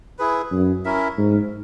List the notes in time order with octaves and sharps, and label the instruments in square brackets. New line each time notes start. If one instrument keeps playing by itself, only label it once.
[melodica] E4 G#4 B4
[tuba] F#2
[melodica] C#4 E4 A#4 E5
[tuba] G#2